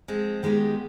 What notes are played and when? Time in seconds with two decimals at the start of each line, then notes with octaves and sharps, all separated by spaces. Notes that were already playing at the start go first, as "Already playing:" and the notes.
0.08 F3 G#3 C4
0.43 D#3 G#3 B3 D#4 G4